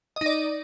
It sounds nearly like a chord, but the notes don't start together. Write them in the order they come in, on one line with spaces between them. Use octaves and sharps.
D#5 D#4 D5